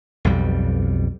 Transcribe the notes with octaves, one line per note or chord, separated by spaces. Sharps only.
B1 F2 G3